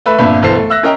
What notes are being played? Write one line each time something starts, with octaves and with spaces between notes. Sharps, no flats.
A3 B4 E5 B5
G1 F2 A#2 D4 E5 B5
E1 B1 E3 A4 C5 C7
A3
E5 E6 F#6 A#6
C#4 A#4 D#5 G5 A#5